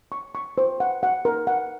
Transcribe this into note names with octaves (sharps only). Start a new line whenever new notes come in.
C#6
C#6
C5
F#5
F#5
A#4
F#5